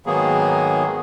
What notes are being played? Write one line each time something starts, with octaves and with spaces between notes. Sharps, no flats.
G#2 D#3 F#3 A#3 B3 G#4